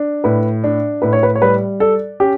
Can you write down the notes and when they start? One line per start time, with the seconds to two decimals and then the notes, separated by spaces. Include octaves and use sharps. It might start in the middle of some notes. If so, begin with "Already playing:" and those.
Already playing: D4
0.24 A2 B4
0.64 D4
1.02 A2 B4
1.13 C#5
1.23 B4
1.35 C#5
1.42 G3 B4
1.80 A4 D5
2.20 C#4 G4